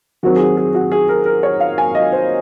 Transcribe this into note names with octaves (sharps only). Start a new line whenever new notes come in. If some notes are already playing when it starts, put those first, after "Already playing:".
D#3 F#3 C4 F#4
G#4
F#4
G#4
F#4
G#4
A#4
A#4
C#5
F5
G#5
D#5
C5